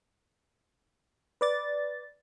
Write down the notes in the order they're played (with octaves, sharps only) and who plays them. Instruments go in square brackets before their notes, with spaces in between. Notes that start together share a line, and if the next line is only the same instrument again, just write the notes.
[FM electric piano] B4 D5 A6